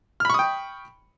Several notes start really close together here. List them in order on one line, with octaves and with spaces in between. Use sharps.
F6 B5 C#6 D#6 G5